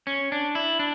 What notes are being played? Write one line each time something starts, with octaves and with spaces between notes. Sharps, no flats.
C#4
D4
E4
D4